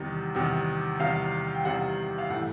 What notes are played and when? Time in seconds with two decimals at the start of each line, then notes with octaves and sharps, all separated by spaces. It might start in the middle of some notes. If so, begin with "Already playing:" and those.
Already playing: E2 C3 D#3 G3
0.35 E2 C3 D#3 G3
1.00 E2 C3 D#3 G3 F5
1.54 G5
1.65 E2 C3 D#3 G3 F#5
2.18 F5
2.30 A2 E3 A3 F#5